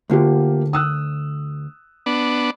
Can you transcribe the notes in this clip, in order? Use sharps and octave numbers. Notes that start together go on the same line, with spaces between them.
D2 D3 A#3 F4 G4
D#6 E6 F#6
B3 D4